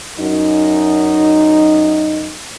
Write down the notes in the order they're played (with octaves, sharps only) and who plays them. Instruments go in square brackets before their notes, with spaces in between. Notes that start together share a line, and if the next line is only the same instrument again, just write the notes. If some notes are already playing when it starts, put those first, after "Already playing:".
[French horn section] F#2 D#4